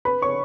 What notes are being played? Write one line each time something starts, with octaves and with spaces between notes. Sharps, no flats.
B4 B5
C#5 C#6